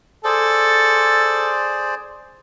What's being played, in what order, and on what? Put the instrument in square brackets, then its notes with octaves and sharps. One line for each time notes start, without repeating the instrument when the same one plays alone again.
[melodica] G#4 C5 D5 [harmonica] A4